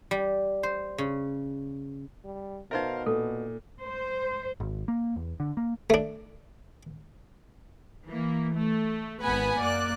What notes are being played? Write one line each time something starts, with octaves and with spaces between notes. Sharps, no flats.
G3
C5
C#3
G3
B2 D#4 A#4 C5 E5 F5
A#2 A4
C5
G#1
A#3
E2
D3
A#3
A3 D4
E3 A#3
A3
G#1 B3 B4 F#5 G#5 B5
F#2 A#3 D5 F#6